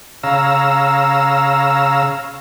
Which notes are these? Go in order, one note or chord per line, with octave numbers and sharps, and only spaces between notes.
C#3 F5 A#5 E6